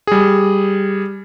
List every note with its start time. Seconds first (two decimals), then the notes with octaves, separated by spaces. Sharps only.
0.07 G3 G#4